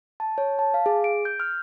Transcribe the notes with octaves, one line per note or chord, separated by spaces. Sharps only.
A5
C#5
A5
F5
G#4
D7
G6
F6